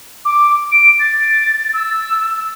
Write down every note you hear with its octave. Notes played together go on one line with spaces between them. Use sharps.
D6
D7
A6
E6